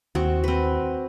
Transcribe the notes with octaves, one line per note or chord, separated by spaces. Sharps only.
D#2 C4 F#4
C4 B4